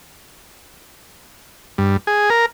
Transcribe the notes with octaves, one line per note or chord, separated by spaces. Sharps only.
G2
G#4
A#4